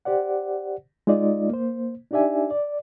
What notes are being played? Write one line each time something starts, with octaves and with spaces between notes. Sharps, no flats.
G4 C5 D5 F#5
G#3 D#4 F4 D5 D#5
A#3 C5
D4 D#4 G4 D5 E5 G#5
D5